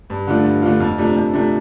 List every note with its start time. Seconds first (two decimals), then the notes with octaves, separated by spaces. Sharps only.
0.10 G2
0.27 D3 A3 D4 F4
0.44 G2
0.62 D3 A3 D4 F4
0.80 F2
0.98 C3 F3 A3 D4
1.16 F2
1.34 C3 F3 A3 D4